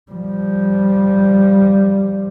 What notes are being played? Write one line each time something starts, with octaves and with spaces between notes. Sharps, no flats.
F3 G3